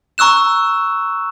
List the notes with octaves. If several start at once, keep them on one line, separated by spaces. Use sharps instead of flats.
A#5 C#6 E6 F#6 E7